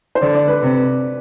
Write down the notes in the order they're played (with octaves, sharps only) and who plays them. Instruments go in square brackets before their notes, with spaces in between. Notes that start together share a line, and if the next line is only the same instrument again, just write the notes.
[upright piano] C5
[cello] D3 [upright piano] D5
[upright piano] D5
B4
[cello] C3